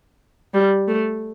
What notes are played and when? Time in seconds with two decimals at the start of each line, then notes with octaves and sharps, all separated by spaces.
0.54 G3
0.88 A3